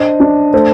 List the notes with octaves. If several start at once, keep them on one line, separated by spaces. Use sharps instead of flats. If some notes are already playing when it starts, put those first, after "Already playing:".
Already playing: D4 C5 D#5
D4
A3 A4 C5